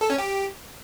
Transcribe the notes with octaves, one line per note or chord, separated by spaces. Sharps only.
A4
C#4
G4